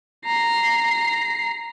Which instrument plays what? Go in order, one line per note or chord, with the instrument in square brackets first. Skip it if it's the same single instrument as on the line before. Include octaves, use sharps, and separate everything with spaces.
[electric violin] A#5 C7